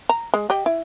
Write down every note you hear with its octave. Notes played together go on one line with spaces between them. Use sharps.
A#5
G#3
G4 D#5 G5
E4